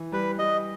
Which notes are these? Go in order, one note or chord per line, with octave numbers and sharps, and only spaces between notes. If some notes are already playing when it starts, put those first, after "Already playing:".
Already playing: E3
G3 B4
G3 D#5